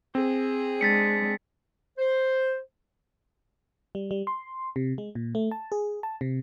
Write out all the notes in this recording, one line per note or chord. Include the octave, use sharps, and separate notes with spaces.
C4 G#4
G#3 D4 A6 B6 C#7
C5
G3
G3
C6
C3
G#3
A#2
A3
A5
G#4
A5
C3